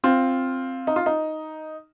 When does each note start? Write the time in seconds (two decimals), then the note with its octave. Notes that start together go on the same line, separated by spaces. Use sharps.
0.04 C4 F4
0.87 D#4
0.96 F4
1.06 D#4